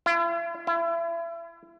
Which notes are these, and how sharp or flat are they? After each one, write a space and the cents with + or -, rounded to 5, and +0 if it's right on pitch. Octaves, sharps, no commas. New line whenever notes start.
E4 +45
E4 +35